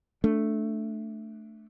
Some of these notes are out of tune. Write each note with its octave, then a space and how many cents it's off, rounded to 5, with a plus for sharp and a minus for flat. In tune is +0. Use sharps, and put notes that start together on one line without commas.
A3 +0 D4 +0